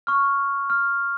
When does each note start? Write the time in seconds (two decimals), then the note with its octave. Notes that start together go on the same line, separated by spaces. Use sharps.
0.07 C#6 F6
0.70 F6